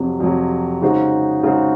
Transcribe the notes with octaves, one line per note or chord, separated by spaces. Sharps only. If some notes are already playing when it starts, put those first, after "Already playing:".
Already playing: F2 C3 F#3
F2 C3 F#3
C#3 G#3 D#4 F#4 C5
C#3 G#3 D#4 F#4 C5